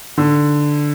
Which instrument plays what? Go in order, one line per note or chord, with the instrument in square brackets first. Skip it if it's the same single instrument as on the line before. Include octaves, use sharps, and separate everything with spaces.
[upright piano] D3